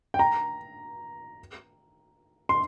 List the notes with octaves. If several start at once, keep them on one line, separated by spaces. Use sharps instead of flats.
G5
A#5
C6